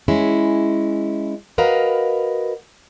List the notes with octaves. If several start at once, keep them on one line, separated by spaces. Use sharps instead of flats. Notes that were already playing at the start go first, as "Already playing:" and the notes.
G#3 C#4 E4
F#4 A#4 B4 D#5 F5